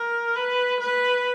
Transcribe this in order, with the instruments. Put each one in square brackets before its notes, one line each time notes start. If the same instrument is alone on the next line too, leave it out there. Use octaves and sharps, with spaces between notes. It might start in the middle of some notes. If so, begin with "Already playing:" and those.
Already playing: [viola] A#4
B4
B4